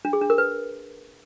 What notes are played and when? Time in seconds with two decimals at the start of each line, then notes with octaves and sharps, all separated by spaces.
0.05 D4
0.13 G#4
0.21 D4
0.30 A#4
0.38 B4